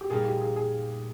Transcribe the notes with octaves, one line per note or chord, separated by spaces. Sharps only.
G4
A#2 G3 A#3 D#4 G#4
G4
G#4
G#4